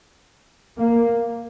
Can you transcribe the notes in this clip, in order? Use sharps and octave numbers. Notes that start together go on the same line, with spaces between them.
A#3